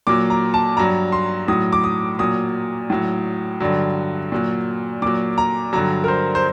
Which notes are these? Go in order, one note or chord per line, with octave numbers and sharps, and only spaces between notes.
A#2 F#3 D6
A#5
A5
G2 F#3 A#5
C6
A2 F#3 D#6
D6
D#6
A#2 F#3 D#6
A2 F#3
G2 D3 F#3
A#2 F#3
A#2 F#3 D6
A#5
G2 D3 F#3 A#5
A#4
C5
C5